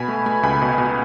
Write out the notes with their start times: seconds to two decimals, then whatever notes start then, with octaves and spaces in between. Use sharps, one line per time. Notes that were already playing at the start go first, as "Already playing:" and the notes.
Already playing: B2 G#5 B5
0.08 A3
0.26 A3 G#5 B5
0.43 C#2 G#5 B5
0.62 B2
0.78 B2